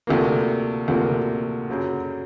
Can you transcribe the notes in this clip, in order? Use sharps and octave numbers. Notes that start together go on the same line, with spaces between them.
D2 C3 F3 A#3
D2 C3 F3 A#3
F#2 C#3 F#3